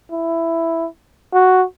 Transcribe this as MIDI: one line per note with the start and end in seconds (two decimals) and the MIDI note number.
0.12 0.87 64
1.33 1.63 66